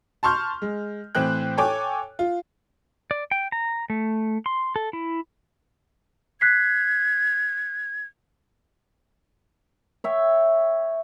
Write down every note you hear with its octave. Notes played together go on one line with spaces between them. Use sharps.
A5 C6 C#6 F6 G6
G#3
A2 E3 C4 C5 G5 F#6
A4 C#5 G5 G#5 D6
F4
D5
G5
A#5
A3
C6
A4
E4
F#6 G#6 B6 C7
C#5 E5 G5